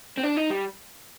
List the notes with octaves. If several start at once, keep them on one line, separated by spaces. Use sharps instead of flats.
C4
D4
D#4
G3